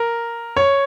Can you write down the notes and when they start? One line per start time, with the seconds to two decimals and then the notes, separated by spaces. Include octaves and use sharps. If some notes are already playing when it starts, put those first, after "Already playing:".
Already playing: A#4
0.57 C#5